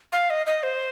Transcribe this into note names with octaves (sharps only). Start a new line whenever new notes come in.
F5
D#5
D#5
C5